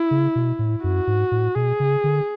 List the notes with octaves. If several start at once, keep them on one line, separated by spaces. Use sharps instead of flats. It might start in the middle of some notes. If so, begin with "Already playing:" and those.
Already playing: E4
C#3
B2
A2
F#2 F#4
G#2
A2
B2 G#4
C#3
D3